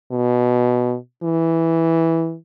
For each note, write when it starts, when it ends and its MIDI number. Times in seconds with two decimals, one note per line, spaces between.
0.11 0.95 47
1.23 2.36 52